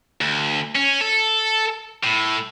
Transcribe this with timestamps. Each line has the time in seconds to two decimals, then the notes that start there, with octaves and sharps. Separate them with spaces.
0.21 D2
0.75 C#4
1.01 A4
2.03 A2